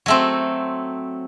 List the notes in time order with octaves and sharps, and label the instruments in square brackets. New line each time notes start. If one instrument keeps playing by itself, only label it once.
[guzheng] F#3 A3 C4